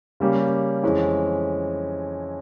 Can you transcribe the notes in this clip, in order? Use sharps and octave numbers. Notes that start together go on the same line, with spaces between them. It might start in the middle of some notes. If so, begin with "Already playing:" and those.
C#3 G3 A#3 C#4 G4
F2 E3 G#3 C#4